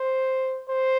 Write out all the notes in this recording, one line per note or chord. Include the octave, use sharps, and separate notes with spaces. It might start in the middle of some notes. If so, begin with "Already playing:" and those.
Already playing: C5
C5